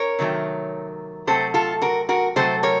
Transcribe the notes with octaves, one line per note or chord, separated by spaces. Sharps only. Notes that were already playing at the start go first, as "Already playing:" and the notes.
Already playing: A#4 C#5
C3 D#3 F#3 A3
C3 F#3 A3 A4 C5
F4 A4
F#4 A#4
F#4 A#4
C3 F#3 A3 A4 C5
A#4 C#5